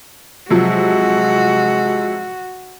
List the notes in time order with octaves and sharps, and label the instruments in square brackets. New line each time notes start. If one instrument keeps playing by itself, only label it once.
[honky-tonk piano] C3 F3 F#3 [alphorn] G#3 [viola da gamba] F#4